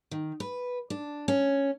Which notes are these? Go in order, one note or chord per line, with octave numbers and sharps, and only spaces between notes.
D#3
B4
D4
C#4